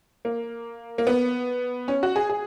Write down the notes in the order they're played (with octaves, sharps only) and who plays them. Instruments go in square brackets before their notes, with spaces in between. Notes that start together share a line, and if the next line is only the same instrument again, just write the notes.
[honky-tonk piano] A#3
A#3
B3
C#4
F#4
G#4
G#4